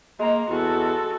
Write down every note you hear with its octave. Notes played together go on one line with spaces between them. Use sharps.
G#3 A#3 A#5 C6
E2 F#4 A4